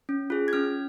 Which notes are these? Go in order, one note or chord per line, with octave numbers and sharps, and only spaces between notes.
C#4
F4 G#4
G#6
C#4 F6